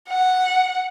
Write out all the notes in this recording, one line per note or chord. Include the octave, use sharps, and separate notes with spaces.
F#5